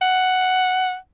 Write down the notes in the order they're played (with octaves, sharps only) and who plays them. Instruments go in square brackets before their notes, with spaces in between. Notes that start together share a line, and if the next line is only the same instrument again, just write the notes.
[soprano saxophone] F#5